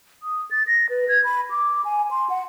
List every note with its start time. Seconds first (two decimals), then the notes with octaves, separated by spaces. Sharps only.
0.23 D#6
0.51 A6
0.67 A#6
0.90 B4
1.09 G#6
1.24 B5
1.51 D6
1.85 G#5
2.11 C6
2.30 F#5